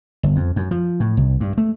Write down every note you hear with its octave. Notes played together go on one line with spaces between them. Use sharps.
G1
F2
F#2
F3
A2
C2
G2
A3